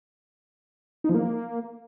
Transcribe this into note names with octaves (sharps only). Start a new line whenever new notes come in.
D#4
F3
A#3